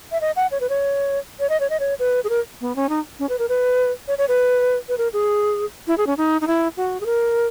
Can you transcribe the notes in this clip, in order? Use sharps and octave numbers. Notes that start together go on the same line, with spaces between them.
E5
D#5
F#5
C#5
B4
C#5
C#5
D#5
C#5
D#5
C#5
B4
G#4
A#4
B3
C#4
D#4
C#4
B4
A#4
B4
C#5
C#5
B4
B4
A#4
G#4
E4
G#4
C#4
D#4
D#4
E4
F#4
G#4
A#4